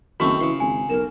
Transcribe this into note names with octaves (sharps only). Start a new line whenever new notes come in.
F#1 D#3 A3 C4 F#4 C#6
C#3 E3 C6
G#1 G#5
B1 A#4 E7